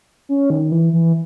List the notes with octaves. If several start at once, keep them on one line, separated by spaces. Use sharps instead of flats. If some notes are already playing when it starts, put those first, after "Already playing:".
C#4
D#3
E3
E3